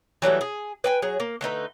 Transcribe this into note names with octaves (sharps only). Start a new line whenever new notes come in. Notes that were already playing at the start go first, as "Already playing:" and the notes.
E3 F#3 G3 A3
G#4
B4 G5 G#5
F#3 G#4
A#3
D3 A3 D#4 B4